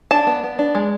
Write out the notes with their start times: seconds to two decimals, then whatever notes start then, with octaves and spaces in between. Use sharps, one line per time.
0.11 D4 A5
0.27 B3
0.43 B3
0.59 D4
0.75 G#3